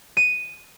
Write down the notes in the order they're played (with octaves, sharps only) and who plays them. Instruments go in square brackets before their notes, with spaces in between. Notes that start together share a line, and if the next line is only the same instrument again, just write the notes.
[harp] D#7